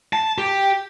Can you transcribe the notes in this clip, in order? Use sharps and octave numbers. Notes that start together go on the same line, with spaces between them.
A5
G4